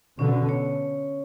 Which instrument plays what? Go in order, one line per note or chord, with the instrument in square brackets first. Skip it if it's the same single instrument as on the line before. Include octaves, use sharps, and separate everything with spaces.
[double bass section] B2 D3 [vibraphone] C#4
[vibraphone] C#5